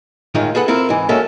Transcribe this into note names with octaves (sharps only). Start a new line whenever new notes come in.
A2 D#3 G#3 D#4 F4
G#4 A4 B4 F#5
C4 E4 F4 A#4
G#2 E3
F#3 G#3 A#3 C#4 A4 E5